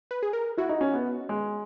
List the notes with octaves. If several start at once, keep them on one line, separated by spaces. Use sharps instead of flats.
B4
G#4
A#4
E4 F#4
D#4
C#4
B3
G#3